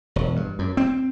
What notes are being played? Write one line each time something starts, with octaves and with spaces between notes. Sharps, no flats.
E1
G2
F#2
C4